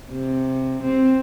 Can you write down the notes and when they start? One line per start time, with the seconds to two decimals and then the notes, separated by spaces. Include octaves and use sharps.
0.12 C3
0.83 C4